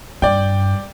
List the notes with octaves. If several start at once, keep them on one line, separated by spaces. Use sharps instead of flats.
G2 D5 G5